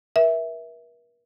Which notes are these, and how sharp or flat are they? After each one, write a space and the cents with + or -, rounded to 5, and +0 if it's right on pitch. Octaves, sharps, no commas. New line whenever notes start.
A#4 +45 E5 -10